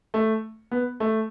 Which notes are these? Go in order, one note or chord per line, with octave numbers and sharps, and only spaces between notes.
A3
B3
A3